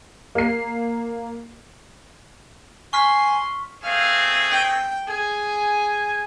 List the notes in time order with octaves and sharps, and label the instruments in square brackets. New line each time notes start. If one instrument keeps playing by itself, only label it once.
[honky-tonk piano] A#3 C7
[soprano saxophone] G#5 [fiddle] C6 [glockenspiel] C#6 F6 B6
[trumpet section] A3 C4 G#4 [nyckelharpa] F5
[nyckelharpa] G5
[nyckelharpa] G#4 [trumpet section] G#5